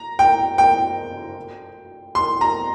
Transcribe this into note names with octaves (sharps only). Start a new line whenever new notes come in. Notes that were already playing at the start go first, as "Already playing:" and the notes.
Already playing: A#5
G5
G5
C6
A#5